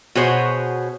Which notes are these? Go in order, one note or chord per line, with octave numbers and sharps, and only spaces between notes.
B2 F#4 G#4 C5 C#5